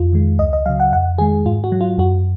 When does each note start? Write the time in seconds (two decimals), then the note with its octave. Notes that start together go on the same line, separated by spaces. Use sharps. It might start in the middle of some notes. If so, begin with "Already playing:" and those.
Already playing: F2 F4
0.13 D#3 G#3
0.39 C#2 D#5
0.53 D#5
0.66 C#3 F#3 F5
0.80 F#5
0.92 F2 F#5
1.18 D#3 G#3 G#4
1.46 G#2 F4
1.64 F#4
1.72 F#3
1.81 F4
1.98 F#2 F#4